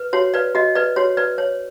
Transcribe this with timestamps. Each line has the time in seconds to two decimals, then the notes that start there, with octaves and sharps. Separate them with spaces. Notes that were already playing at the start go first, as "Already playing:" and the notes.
Already playing: B4
0.13 F#4 C#5
0.34 B4 D5
0.55 F#4 D#5
0.75 B4 D5
0.96 F#4 C#5
1.17 B4 D5
1.38 C#5